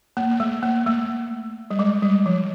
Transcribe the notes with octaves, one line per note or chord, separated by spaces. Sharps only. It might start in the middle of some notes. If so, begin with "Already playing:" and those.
A#3
A#3
A3
A#3
A3
G3
G#3
G3
F3